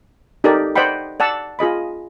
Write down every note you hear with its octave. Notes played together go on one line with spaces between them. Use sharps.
D#4 G4 A4 A#4 D5
C5 D5 D#5 F#5 G5 B5
D5 F#5 A5 E6
F4 G#4 D#5 B5